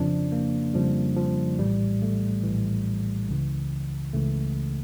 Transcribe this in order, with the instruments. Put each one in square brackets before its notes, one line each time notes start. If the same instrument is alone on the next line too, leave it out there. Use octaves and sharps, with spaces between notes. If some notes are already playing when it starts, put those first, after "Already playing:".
Already playing: [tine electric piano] F2 C#3 F3 D4
A#3
F2 C#3 F3 G3
F3
A#1 A2 E3 G3
A3
A#1 A2 E3
C#2 C#3 E3
C#2 C#3 E3 A3